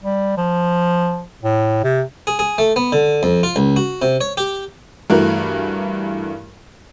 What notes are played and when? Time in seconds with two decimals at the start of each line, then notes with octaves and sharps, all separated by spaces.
0.03 G3
0.37 F3
1.43 A2
1.84 C3
2.27 G#4
2.39 G#4
2.58 A3
2.76 B3
2.92 D3
3.23 F2
3.43 F4
3.56 C#2
3.76 F#4
4.02 C3
4.21 C#5
4.37 G4
5.10 G2 E3 A3 F#4 A#4